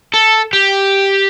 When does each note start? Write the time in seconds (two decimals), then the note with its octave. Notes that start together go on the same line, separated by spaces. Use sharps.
0.14 A4
0.53 G4